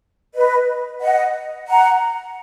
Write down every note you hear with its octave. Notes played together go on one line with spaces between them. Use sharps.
B4 D#5
D#5 F#5
F#5 A#5